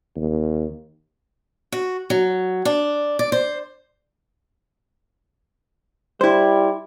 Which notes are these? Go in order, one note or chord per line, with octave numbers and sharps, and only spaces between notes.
D#2
F#4
F#3
D4
D5
C5
G3 E4 C5